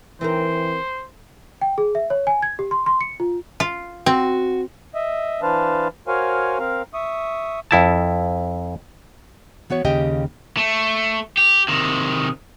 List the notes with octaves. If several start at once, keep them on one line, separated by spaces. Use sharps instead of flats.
E3 C4 D#4 A#4 C5
G5
G#4
E5
C#5
G#5
G#6
G4
C6
C6
C#7
F4
F4
C4 F#4
D#5 E5
E3 D4 B4 C5 F5 A5
F#4 A#4 C5 C#5 F5 G#5
C4 A#4 F5
E5 C#6 D#6
F2 E4 A5
E3 B3 F#4 C#5
D#2 C#3 G4 D#5 G5
A3
G4
C3 D#3